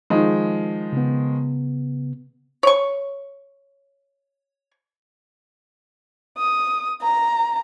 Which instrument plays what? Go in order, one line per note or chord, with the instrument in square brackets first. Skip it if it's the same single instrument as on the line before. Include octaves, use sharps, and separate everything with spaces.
[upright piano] D#3 F3 G#3
[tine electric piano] C#3 B3
[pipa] C#5 C#6
[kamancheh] D#6
A#5